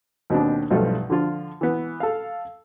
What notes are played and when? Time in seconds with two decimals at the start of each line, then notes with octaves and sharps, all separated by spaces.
0.30 D#2 B2 C4 D4
0.70 B1 G2 F3 A3 F4
1.10 D3 F3 F4
1.61 E3 B3
2.00 A4 F5